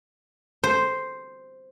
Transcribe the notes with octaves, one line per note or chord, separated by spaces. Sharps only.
C5